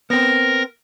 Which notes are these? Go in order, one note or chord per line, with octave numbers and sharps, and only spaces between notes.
B3 C4 A#4 A#6